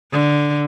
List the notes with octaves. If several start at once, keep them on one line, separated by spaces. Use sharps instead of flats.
D3